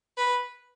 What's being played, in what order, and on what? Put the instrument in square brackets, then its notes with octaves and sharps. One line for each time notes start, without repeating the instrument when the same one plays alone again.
[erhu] B4